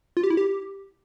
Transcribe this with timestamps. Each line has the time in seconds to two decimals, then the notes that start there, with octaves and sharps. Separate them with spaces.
0.17 F4
0.24 G4
0.30 E4
0.37 G4